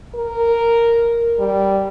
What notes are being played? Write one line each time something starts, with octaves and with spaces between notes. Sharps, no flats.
A#4
G3